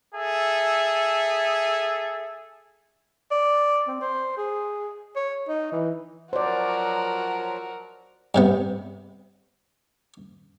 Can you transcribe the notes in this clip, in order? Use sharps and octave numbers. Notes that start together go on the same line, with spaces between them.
G#4 A4 E5
D5
C4
C5
G#4
C#5
D#4
E3
F3 F#3 F#4 A#4 C5 D5
G2 C3 B3